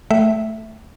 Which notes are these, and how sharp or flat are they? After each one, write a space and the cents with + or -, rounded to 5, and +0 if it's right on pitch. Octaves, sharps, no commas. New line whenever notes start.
A3 +0 E5 +0 G5 -45